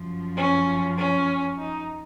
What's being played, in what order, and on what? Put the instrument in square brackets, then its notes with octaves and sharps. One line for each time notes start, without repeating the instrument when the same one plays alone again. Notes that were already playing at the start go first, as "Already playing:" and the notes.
Already playing: [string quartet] F#2 F3
C#4
C#4
D#4